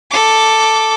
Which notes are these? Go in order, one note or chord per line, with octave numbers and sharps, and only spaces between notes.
A4 D6